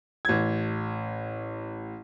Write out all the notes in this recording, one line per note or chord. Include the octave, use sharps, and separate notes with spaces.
A1 G#6